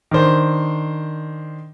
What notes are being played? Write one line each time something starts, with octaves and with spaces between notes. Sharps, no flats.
D#3 D4 C5